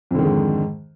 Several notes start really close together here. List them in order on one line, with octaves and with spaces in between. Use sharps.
F2 D3 D#3 G#2